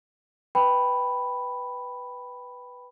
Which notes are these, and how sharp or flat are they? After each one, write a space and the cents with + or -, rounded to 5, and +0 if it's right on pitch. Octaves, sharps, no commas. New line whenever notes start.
B4 +0 G5 +0 B5 +0